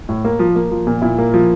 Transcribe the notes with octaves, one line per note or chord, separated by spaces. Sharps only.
A2
A#3
F3
A#3
F3
A#2
A#2 E4
A#3
F3